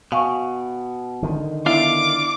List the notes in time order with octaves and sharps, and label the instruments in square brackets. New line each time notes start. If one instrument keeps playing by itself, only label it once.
[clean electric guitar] B2 [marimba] F5 G#5 C#6
[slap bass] D3 D#3
[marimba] B3 E4 E5 [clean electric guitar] D4 F4 F5 [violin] D6